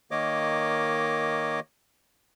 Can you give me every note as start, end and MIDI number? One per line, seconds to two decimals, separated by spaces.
0.11 1.60 51
0.11 1.60 58
0.11 1.60 73
0.11 1.60 75
0.11 1.60 86